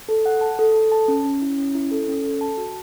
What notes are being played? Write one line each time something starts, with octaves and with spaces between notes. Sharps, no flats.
A4
F#5
A5
A4
A4
A5
C#4
C#4
E4
C#4
E4
A4
C#4
A4
A5
F#4